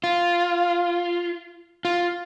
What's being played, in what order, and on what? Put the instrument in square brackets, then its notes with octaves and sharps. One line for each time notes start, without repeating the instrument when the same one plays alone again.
[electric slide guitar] F4
F4